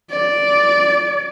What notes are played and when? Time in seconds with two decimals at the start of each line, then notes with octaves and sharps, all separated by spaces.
0.10 D5